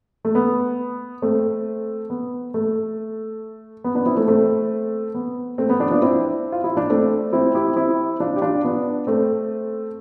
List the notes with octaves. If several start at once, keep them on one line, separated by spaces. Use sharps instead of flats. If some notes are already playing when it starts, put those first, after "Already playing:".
A3
B3
A3 C4
B3
A3
B3
B3 D4
C4 E4
A3 C4
A3 C4
B3
A3 C4
B3
B3 D4
D4 F4
C4 E4
F4
E4
D4
A3 C4
C4 E4
E4 G4
C4 E4
D4 F4
G4
D4 F4
B3 D4
A3 C4